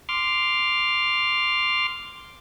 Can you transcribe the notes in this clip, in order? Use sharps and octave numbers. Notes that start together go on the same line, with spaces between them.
C6 D6 F6